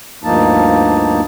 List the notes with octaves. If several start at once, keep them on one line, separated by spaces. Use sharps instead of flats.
D2 G2 F3 A#3 D#4 A5